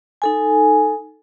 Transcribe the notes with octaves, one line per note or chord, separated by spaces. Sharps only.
D#4 A4 G#5